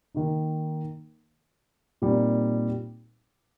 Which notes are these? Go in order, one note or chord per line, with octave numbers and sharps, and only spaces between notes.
D#3 A#3 D#4
A#2 G3 C4 D#4